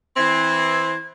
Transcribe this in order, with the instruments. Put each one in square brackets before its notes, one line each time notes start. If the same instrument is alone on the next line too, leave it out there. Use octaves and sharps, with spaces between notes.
[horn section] E3 C4 [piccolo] G#6